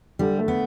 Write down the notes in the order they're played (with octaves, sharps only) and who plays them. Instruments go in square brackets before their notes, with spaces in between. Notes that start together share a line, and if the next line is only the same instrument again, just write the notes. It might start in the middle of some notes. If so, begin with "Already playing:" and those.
[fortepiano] D3 [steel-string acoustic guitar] G3
[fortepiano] A3
[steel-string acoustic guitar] B3